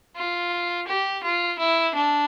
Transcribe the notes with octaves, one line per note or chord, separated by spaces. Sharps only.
F4
G4
F4
E4
D4